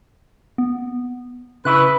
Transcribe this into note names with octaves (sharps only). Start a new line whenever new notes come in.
B3
C#3 E4 B4 F#6